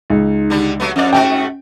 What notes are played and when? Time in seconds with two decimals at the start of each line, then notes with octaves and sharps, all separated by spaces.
0.10 C#2 D#4
0.50 D3 G3
0.80 F#3 A3 B3
0.96 F2 C#4 D5
1.13 G#2 A3 F#4 G5